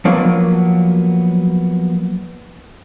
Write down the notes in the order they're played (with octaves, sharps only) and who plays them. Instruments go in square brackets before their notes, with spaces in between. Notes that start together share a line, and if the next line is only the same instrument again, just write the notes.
[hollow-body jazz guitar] F3 F#3 A#3 B3